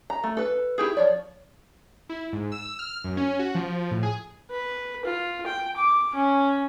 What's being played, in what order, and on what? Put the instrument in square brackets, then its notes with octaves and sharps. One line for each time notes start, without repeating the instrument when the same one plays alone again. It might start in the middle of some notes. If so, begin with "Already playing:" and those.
[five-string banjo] A#5
A3
A4 B4
E4 G4 G#4
F3 C#5 D5
[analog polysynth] E4
G#2
E6
F6
F#2
C#4
F#4
F3
A2
G#4
[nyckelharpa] B4
F4
G5
D6
C#4